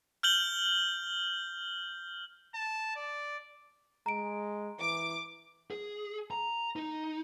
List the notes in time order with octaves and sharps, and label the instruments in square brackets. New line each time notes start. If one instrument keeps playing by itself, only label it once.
[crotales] F6 G6 F#7 G7
[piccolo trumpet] A5
D5
[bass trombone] G#3 [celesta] A#5 D7
[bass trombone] E3 [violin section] D6
[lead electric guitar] G#4
A#5
D#4